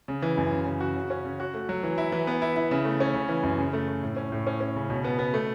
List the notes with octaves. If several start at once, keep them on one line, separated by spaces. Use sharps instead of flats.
C#3
E3
F#2
C#3
C#3
F#4
C#3
C#4
C#3
F#4
A3
F#3
E3
E4
E3
B3
E4
E4
C#3
A3
C#4
C#3
E3
F#2
C#3
A3
A3
A2
C#4
A2
C#4
C#4
C#3
B2
B3
B3
A3